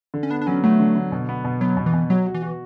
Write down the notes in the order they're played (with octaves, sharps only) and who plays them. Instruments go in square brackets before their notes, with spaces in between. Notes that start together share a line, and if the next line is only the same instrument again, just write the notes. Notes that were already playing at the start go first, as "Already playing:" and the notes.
[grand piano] D3
[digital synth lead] C#4
[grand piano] B3 [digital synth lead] D4
[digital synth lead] D4
[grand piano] F#3 [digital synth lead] C#4
[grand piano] F#3 [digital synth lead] A3
[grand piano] D3
D3
B2
B3
B2
[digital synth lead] F#3 [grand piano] B3
[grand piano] B2
[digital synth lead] E3
[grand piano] B2
[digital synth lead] F#3 [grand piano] F#4
[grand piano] F#4
[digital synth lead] E3
[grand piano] F#4